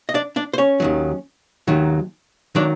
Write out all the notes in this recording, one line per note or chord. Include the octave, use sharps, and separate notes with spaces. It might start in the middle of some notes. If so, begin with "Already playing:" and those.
D#5
D4 D5
D4 D5
C5
C#4 C#5
D#2 D#3 F#3
D#2 D#3 F#3
D#3 F#3 D4 D5